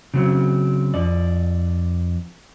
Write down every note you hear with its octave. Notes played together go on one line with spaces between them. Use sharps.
C#3 F#3 C4
F2 D5